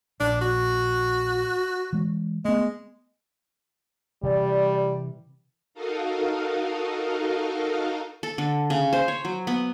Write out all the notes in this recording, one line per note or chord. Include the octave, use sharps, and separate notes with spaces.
A#1 D4
F#4
E3 G#3
G#3 A3 B3
C3 E3 G3 D5
D#4 F#4 A4 A#4 D#5 F5
A4
D3
C#3
C5
C#5
F#3
B3